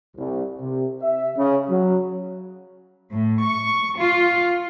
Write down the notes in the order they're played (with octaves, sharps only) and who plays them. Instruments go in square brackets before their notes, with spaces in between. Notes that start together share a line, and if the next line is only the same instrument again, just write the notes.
[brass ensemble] C2
C3
E5
C#3
F#3
[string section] A2
C#6
F4